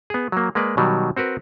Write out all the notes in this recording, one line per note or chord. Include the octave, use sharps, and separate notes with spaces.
B3 G#4
F#3 A#3
G#3 A#3 B4 D5
B2 D#3 F#3 G3
C4 F#4 A#4 B4